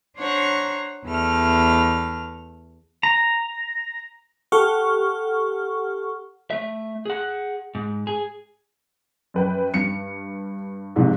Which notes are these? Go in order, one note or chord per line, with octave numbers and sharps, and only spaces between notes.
D4 C5 C#5 F#5 A#5
E2 A3 F6
A#5
G4 A4 F#5 C#6 F6
A3 E5
G#4 F#5
G#2
G#4
F#2 B4 G5
G2 C#7
A#1 G#2 C3